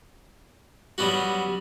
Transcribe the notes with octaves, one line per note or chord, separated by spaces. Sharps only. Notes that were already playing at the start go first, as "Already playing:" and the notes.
F#3 G3 B3 C#4 F#4